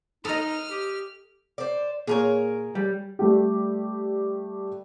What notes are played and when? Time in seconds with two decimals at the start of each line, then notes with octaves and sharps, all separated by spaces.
0.25 D#4 A4 D#5 D#6 F6
0.70 G4
1.58 C5 D5
2.07 A#2 G#4 A#4 C#5
2.75 G3
3.19 G3 A3 G4